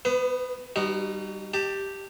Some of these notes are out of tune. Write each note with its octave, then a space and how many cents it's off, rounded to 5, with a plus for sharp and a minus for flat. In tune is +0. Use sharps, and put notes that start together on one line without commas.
B3 +0 B4 +40
G3 +0 D#4 -20 F#4 +30
G4 +0 A5 +20